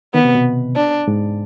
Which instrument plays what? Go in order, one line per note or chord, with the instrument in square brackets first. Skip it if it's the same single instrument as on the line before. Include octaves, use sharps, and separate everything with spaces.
[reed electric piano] D#3 [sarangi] B3
[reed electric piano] C3
B2
[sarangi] D4
[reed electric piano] G#2